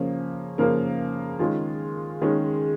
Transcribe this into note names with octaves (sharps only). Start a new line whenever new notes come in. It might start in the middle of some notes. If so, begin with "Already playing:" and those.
Already playing: C#3 F3 A#3 C#4
C#3 F3 A#3 C#4 A#4
D#3 G#3 C#4 F4
D#3 G#3 C#4